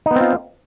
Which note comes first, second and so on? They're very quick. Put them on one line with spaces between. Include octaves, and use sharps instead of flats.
D#4 B3 C4 F4